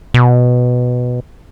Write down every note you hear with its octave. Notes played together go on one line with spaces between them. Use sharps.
B2